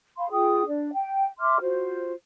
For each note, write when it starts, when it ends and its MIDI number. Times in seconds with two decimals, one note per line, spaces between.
0.17 0.28 77
0.17 0.28 83
0.17 0.28 84
0.30 0.64 65
0.30 0.64 68
0.30 0.64 79
0.30 0.64 87
0.66 0.90 62
0.66 0.90 74
0.92 1.26 79
1.40 1.58 76
1.40 1.58 84
1.40 1.58 86
1.40 1.58 89
1.60 2.12 65
1.60 2.12 66
1.60 2.12 72